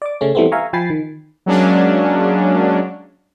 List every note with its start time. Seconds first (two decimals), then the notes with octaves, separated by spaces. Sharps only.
0.02 D5 D6
0.21 C#3 A3 C#4
0.35 E3 G3 A3 B3 C4
0.52 E5 F5 G#5 A#5 C#6
0.73 F3 G5 G#5 B5 A6 C7
0.90 D#3
1.46 F#3 G#3 A#3 C#4 D4